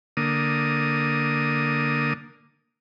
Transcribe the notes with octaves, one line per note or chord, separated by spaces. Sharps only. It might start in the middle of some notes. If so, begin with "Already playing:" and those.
D3 A#3 D#6